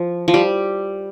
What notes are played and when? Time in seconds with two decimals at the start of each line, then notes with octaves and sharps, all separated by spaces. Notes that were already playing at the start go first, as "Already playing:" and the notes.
Already playing: F3
0.28 F3
0.34 G3